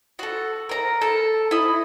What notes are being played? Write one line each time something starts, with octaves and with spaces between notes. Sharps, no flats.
F#4 A4
A#4 A#5
A4
E4 D#5